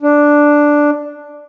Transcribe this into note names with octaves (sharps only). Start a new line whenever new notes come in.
D4